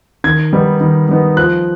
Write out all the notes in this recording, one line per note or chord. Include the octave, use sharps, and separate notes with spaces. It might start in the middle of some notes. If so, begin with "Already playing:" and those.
D#3 G#6
G3 B3 D#4
D#3
G3 B3 D#4
F3 F#6